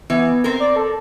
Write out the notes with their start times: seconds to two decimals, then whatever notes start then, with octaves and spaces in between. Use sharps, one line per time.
0.10 E3 B3
0.44 C4 A#4
0.60 D5
0.76 A4